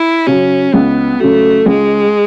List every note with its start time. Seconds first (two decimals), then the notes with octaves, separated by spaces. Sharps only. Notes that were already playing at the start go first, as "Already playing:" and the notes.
Already playing: E4
0.27 C#3 F#3 C#4
0.73 C#2 B3
1.20 C#3 F#3 A3
1.66 C#2 G#3